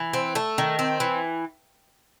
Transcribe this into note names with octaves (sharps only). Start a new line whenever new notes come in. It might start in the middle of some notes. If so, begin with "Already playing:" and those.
Already playing: E3
C4
A3
D#3
C4
E3